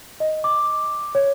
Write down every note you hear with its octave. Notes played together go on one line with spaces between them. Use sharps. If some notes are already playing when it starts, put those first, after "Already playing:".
D#5
D6
C#5